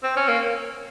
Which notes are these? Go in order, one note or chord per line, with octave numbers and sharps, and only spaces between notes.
C4
C#4
A#3